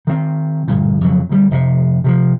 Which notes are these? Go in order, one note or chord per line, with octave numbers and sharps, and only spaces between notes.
D#3 C4
D2 G2 A#2
F2 C#3 F#3
D2 F#3 G3
F1 C3
C3 D#3 F3